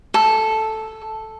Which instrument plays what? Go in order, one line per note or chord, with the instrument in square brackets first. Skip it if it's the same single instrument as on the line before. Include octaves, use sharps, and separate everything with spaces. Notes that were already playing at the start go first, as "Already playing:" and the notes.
[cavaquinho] A4